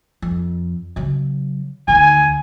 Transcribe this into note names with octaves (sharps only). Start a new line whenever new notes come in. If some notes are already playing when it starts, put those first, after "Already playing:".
F2
C#3 F#3
D2 D#3 G#5